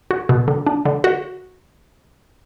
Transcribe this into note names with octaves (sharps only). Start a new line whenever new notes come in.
F#4
B2
D3
D4
D3
F#4